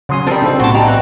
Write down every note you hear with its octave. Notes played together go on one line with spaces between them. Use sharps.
C#3 F#3 C#4 F#5 C6 D#6
F3 G3 C4 A4 A#4 C5
C#3 C4 D4 D#4 A4
B1 A2 C4 F#4 A5
G3 G4 D#5 G5 A#5
E3 F#4